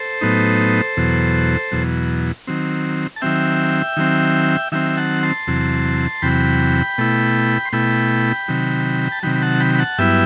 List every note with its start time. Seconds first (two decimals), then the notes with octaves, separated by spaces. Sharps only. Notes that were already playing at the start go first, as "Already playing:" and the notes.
Already playing: A4 C5
0.21 A2 F#3 B3 D#4
0.97 E2 B2 F#3
1.71 E2 B2 F#3
2.47 D#3 F#3 C4
3.16 A5
3.22 D#3 F#3 C4 E5 G5
3.97 D#3 F#3 C4
4.72 D#3 F#3 C4 E5 G5
4.97 F#5 A5
5.23 A5 C6
5.47 E2 C3 F#3
6.22 E2 C3 F#3 G5 B5
6.98 B2 A3 E4
7.65 C6
7.73 B2 A3 E4 G5 B5
8.48 C3 D#3 F#3
9.12 A5
9.23 C3 D#3 F#3 G5 B5
9.35 B5
9.42 F#5 A5
9.60 G5 B5
9.75 B5
9.79 F#5 A5
9.98 G2 F#3 B3 E4 E5 G5